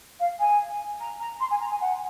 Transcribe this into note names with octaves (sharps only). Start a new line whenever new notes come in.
F5
G#5
A#5
A#5
C6
G#5
A#5
G#5
F#5